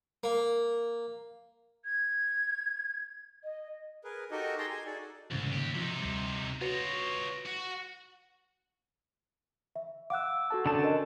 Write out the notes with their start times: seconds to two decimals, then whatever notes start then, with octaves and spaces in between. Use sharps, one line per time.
0.24 A#3
1.85 G#6
3.44 D#5
4.04 G#4 A#4 B4
4.31 D#4 F#4 G4 A4 A#4 D#5
4.58 G4 G#4 G5 A5 A#5 C6
4.70 G#5
4.86 D#4 F#4 G#4 A4 D5
5.31 C2 G#2 C#3 E3
5.52 D#2 G4
5.75 C3 F3 D#4
6.01 D2 G3
6.61 F4 F#4 B4 C#5 A#6
7.46 F#4
9.76 E5
10.10 F5 F#5 D6 E6 F#6
10.50 F#4 A4 A5
10.66 D3 C#4 A5
10.83 A#4 D#5